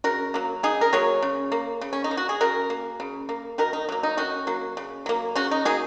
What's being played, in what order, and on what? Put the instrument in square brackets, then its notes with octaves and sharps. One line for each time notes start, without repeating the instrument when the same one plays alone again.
[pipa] C#3 F#4 A#4
F#3 A#3
C#3 D#4 G#4
A#4
F#3 A#3 G#4 C#5
C#3
A#3
C#3
C#4
D#4
A#3
F#4
G#4
C#3 F#4 A#4
A#3
C#3
A#3
D#3 F#4 A#4
D#4
F#3 A#3
D#4
D#3 C#4 F#4
F#3 A#3
C#3
F#3 A#3
C#3 C#4 F#4
D#4
F#3 A#3 D#4 G#4